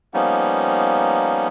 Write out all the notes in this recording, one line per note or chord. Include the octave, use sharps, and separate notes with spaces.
F3 G3 A#3 B3 C#4 D#4